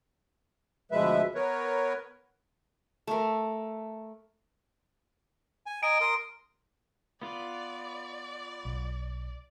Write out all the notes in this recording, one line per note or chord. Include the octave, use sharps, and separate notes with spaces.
D2 B2 F3 G#3 B4 E5
B3 A#4 B4 C#5
A3 A#4
G#5
D#5 G#5 A#5 D7
A#4 C6 D#6
B3 F4 B4 D5
B1